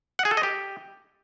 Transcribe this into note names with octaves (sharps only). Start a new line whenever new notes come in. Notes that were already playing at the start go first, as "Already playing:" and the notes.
F#5
G#4
A4
D#5
G4